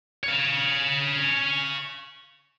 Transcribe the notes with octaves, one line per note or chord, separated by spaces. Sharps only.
C#5 F5